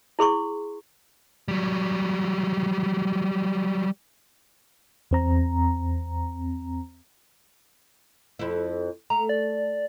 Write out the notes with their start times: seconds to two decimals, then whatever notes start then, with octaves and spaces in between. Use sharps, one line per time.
0.19 E4 G#4 C6 C#6
1.48 F#3 G3
5.11 E2 C4 A#5
8.39 F2 E4
9.10 A3 A#5
9.29 D5